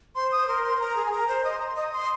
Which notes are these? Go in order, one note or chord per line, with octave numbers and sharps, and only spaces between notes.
C5 C6
C5 D#6
A#4 C6
C6
C5
A#4 A#5
G#4
G#5
A#4 A#5
C5
D#5 D#6
C6
A#5
C6
D#5 D#6
C6